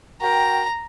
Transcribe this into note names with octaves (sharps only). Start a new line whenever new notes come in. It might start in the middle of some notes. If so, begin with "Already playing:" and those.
F#4 A#4 G5 A#5